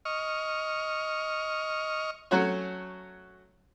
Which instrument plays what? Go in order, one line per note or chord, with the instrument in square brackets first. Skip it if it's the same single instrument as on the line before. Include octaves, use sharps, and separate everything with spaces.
[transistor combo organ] D#5 C#6 F6
[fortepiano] F#3 A3 C#4 F#4 C#5